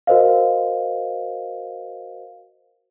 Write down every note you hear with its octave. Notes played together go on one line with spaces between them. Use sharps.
F#4 A#4 C5 D#5 F5